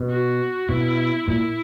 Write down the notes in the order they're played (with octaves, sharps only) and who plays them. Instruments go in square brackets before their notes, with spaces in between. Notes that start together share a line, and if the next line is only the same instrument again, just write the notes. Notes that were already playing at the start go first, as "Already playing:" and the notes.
Already playing: [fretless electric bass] B2
[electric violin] F#4
[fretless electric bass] B2 [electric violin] E4
[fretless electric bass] A#2 [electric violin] E4